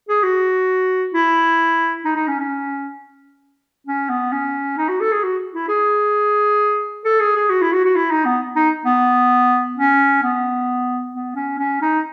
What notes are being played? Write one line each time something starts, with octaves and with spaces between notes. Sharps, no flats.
G#4
F#4
E4
D#4
D#4
C#4
C#4
C#4
B3
C#4
D#4
F#4
A4
G#4
F#4
E4
G#4
A4
G#4
G#4
F#4
E4
F#4
F#4
E4
D#4
B3
D#4
B3
C#4
B3
B3
C#4
C#4
D#4